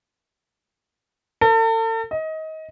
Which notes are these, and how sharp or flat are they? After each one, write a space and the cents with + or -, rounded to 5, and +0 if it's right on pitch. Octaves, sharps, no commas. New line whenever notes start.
A4 +40
D#5 +25